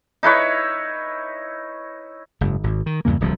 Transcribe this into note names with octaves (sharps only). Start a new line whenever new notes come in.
D#4 E4 B4 C#5
F#1 G#2
G#1
D#3
E2 G2 C#3 A#3
D1 C2 F3